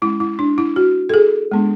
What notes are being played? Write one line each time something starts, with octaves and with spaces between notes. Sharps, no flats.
G#3 C#4 E4
E4
D4
E4
F#4
A4
G#4
G#3 B3 D4